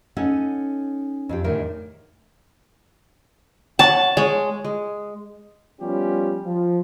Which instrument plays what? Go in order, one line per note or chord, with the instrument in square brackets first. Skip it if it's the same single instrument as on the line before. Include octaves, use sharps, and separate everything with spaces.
[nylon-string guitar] C#4 D#4 A4 C#5 F#5
F2 F4 G4
E2 A2 D3 D#3 A#4 E5
[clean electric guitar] C#5 F#5 [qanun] A5
[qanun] G#3 [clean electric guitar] C#5
[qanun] G#3
[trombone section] F3 G3 B3 C#4 F4 G4
F3